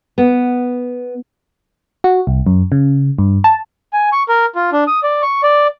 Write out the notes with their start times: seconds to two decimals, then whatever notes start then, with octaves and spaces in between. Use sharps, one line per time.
0.18 B3
2.04 F#4
2.27 C2
2.47 F#2
2.72 C#3
3.19 G2
3.44 A5
3.93 G#5
4.12 C#6
4.29 A#4
4.55 F4
4.73 D4
4.88 D#6
5.03 D5
5.22 C#6
5.43 D5